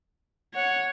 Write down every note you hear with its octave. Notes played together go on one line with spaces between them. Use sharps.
C#5 F#5